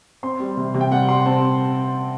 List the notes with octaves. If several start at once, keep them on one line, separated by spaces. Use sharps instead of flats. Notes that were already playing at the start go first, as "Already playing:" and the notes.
C4 C6
G3
C3
C3
G5
G3 F#5
G3 C6
C4 A5